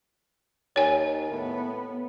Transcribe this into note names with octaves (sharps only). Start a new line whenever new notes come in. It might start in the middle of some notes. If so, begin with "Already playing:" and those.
D#2 C#5 G#5
A2 B3